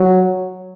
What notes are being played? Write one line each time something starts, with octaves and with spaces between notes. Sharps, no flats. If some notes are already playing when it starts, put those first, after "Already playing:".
Already playing: F#3